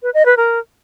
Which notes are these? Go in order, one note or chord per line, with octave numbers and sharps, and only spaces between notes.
B4
D#5
B4
A#4